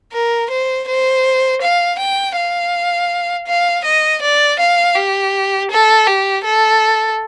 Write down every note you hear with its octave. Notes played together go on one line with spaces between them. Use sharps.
A#4
C5
C5
F5
G5
F5
F5
D#5
D5
F5
G4
A4
G4
A4